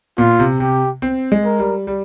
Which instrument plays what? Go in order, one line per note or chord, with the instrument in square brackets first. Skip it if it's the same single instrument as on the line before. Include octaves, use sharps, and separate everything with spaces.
[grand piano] A#2 [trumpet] F4
[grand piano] C3
[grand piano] C3 [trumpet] G4
[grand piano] C4
G#3
[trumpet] A#4
[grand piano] G3
G3